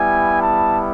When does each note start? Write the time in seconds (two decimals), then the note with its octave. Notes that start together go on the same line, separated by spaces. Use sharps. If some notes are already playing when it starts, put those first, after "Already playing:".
Already playing: G3 B3 E4 G#5
0.42 A5